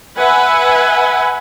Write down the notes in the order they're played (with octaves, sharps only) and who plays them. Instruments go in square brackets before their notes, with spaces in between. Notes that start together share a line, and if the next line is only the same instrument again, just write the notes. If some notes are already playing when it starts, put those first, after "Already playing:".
[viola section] B4 E5 F#5 G#5